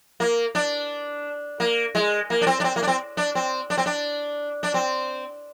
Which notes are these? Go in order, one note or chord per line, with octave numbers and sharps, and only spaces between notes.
A#3
D4
A#3
G#3
A#3
D4
C4
D4
C4
A#3
D4
C4
D4
C4
D4
C4
D4
D4
C4